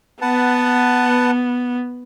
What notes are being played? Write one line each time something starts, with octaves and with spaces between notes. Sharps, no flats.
B3 B4 F#5 A5